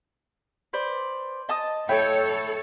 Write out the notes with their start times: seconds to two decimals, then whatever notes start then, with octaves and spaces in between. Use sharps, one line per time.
0.73 B4 C5 D5
1.49 D#5 A5 D#6
1.89 A3 E4 A4 C#5 G5